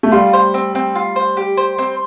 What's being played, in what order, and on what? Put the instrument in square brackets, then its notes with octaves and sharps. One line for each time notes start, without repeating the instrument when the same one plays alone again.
[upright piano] A3
[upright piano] G3 [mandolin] F4
[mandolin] C5
C4
C4
F4
C5
G4
C5
C4